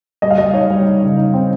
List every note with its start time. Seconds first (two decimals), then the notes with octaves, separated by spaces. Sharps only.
0.22 G3 D#5
0.30 F5
0.38 G3 D#5
0.53 D#4 C#5
0.70 G3
0.86 D#4
1.02 C#3
1.17 D#4
1.34 C4